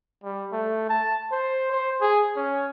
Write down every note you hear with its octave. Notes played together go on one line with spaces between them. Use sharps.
G3
A3
A5
C5
C5
G#4
C#4